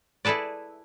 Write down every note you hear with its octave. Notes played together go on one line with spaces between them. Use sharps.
E4 G#4 A4 B4 D5